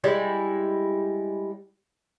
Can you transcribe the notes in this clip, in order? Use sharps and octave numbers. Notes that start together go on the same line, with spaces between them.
G3 G#3 E4